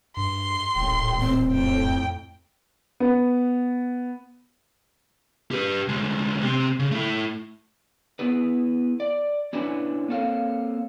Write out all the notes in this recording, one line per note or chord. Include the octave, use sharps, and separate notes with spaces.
G2 C6
D1 A1 A#2 G5
C4
F2 A2 G5
B3
G4 B4
D2 G#3
C3 C4
C#3
A3 E4
B3 E4 G#4 B4
D5
C#4 D4 E4 B4 C#5 G#5
A#3 C4 A4 C#5 F5